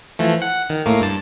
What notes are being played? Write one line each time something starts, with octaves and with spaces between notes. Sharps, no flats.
E3 F3 A3
F#5
D#3
A2 A3 A#3
G2 A5